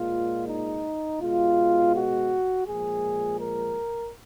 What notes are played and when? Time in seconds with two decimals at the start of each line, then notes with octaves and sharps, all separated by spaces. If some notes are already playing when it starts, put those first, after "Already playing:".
Already playing: A#2 G#3 F4
0.46 D#4
1.20 B2 G#3 F4
1.94 F#4
2.66 A#2 F3 G#3 G#4
3.40 A#4